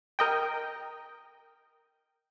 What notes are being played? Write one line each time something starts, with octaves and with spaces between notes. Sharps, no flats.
A#4 D#5 G5